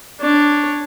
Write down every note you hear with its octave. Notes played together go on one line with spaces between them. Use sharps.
D4 C#5